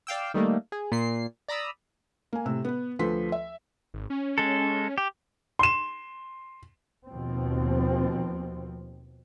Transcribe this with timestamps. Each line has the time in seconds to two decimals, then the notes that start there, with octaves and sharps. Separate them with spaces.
0.07 D5 F5 G5 E6
0.34 D#3 G3 A3 A#3
0.72 G#4
0.92 A#2 C7
1.48 D5 A#5 B5 D#6 E6
2.33 A#3 G#5
2.45 A2 C3 E6
2.65 B3 B4
2.99 D2 F3 A4 B4 C6 B6
3.32 E5
3.94 G#1
4.10 C#4
4.38 G#3 A4
4.98 G4
5.59 C6 E7
7.09 D#2 B2 F3 C4